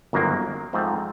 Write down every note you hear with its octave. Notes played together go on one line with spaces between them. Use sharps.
G1 F#2 D#3 F#3 A#3
G#2 F3 A3 C4